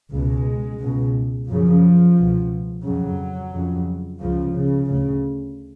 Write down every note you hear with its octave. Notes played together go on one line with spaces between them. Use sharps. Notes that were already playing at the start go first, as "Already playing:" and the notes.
C#2 B2 G#3
C#2 B2
F#2 C#3 F3
C#2 B2
F2 C#3 F#3
F2 C#3
C#2 C#3 F3
C#3
D2 C#3